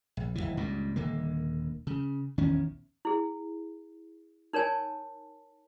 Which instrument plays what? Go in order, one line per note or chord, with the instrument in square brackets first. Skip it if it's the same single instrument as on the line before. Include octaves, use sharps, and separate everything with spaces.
[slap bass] A#1
D1 C2 E3
C#2 G2 A#2
D#1 D3 A#3
C#3
A#1 E2 D#3 C#4
[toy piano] E4 G#4
D#4 A#4 C#5 G#5 A5